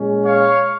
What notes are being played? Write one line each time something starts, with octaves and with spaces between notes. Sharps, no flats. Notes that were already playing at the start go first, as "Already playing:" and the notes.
Already playing: A#2 G#3 C#4
C#5 F5